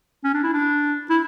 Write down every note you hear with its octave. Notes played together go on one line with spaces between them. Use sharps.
C#4
D4
E4
D4
E4